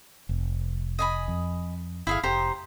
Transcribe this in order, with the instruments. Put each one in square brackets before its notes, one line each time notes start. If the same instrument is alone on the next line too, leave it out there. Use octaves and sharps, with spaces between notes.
[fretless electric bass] F1
[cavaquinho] D#5 G#5 B5
[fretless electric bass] F2
[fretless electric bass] G1 [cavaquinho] E4 G#4 F5
[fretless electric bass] F1 [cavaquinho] G4 C5 A#5